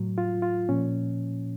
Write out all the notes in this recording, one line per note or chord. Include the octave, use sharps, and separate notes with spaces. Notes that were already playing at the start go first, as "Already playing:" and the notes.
Already playing: A2 F#3
F4
F4
A#2 F3 C#4